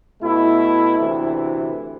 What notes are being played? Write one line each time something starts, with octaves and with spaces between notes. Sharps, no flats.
B2 A3 E4
D2 C3 E3